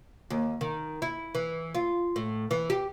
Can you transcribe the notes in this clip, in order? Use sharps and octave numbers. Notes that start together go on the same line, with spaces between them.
D#2
D#3
E4
E3
F4
A2
E3
G4